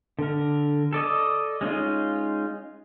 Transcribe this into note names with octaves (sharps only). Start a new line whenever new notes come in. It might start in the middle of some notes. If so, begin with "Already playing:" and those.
D3 A#4
A4 D5 D#5
G#3 C#4 D#4 F4